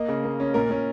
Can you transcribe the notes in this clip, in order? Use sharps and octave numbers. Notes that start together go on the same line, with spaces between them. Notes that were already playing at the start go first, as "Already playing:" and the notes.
Already playing: A#3 D#5
C#3
A#3
C#4
A#2 A#4
A#2 C#4